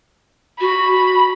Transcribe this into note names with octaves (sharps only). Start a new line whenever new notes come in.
F#4 B5